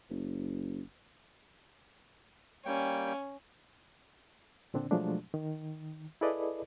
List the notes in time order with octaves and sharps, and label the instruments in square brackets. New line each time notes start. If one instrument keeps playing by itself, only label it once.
[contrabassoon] F#1
[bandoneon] G3 A#3 G5 [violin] C#4
[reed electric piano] A#2 D3 C4 D4
B2 F3 F#3 G#3 A3 D4
D#3
E4 G#4 A4 B4 D5 D#5